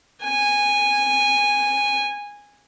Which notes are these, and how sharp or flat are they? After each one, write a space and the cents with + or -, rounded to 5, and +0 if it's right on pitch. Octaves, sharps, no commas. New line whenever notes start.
G#5 -15